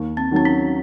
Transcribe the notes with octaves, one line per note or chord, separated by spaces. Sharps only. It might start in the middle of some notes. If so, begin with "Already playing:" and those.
Already playing: D#2
C4
D#3 F#3 C4
C#4